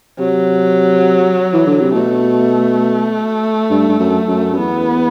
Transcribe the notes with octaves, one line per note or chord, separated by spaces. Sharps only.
C3 F#3
E3
D3
C3
B2 A3
G2
G2
F#2
F#2
F#2
E2 B3